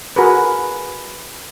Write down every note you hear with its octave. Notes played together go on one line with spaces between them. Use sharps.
F#4 G#4 A#4 B4